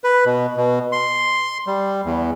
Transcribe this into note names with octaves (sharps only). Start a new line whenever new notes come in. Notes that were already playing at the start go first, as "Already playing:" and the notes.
B4
B2
B2
C6
G3
E2